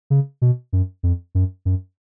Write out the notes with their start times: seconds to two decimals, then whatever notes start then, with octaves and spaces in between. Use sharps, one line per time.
0.10 C#3
0.42 B2
0.73 F#2
1.03 F2
1.35 F#2
1.65 F#2